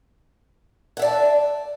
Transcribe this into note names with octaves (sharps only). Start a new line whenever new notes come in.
D5 E5 F#5 A5